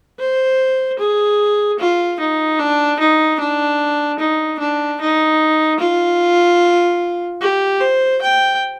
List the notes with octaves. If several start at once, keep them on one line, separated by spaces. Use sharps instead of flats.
C5
G#4
F4
D#4
D4
D#4
D4
D#4
D4
D#4
F4
G4
C5
G5